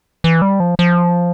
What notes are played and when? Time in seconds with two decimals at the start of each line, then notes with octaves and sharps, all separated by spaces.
0.24 E3
0.42 G3
0.60 F3
0.79 F3